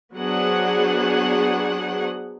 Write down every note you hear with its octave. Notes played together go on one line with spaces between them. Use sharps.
F#3 B3 D4 G#4 C5 F#5